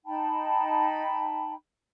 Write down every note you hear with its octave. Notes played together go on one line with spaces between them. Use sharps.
D#4 G5 A5 B5